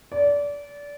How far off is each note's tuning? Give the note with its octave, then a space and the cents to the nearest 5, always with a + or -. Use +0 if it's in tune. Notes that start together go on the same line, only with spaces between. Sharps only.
D5 -25